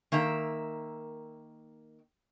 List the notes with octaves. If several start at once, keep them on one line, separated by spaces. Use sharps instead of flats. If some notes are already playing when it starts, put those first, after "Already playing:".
D#3 A#3 E5 A#5